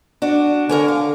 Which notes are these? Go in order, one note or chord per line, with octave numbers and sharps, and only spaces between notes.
D4 F#4
D3 A#4 C#5 G#5
F5